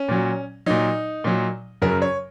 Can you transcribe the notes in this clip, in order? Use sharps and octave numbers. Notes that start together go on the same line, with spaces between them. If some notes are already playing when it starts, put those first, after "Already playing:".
Already playing: C#4
A#2 F#3
A#2 F#3 D#4
A#2 F#3
F#2 C#3 F#3 A#4
C#5